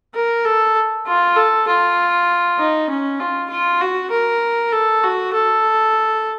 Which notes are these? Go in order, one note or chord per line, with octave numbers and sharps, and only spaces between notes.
A#4
A4
F4
A4
F4
D#4
C#4
F4
F4
F#4
A#4
A4
F#4
A4